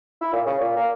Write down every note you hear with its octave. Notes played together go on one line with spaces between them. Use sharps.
E4
A#2
C#3
A#2
A#3